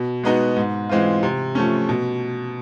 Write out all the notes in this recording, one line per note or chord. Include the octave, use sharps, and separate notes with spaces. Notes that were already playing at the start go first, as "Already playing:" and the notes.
Already playing: B2
G#3 B3 D#4 F#4
G#2
E3 G#3 C4 F4
C3
F3 A3 C#4
B2